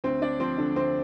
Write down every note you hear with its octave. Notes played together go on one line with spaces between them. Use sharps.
D2 C4 C5
D4 D5
F3 C4 C5
D3 D4
D2 C4 C5